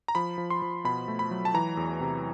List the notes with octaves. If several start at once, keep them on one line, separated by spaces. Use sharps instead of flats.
A#5
F3 B5
F3
C6
F3
B2 B5
A3
B5
F#3
A5
E3 A#5
E2
C3